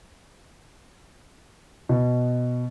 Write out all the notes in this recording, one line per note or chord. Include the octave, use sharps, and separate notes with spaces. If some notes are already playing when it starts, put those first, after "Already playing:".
B2